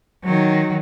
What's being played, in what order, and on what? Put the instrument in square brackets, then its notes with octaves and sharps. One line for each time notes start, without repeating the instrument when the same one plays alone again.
[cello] D#3 F#3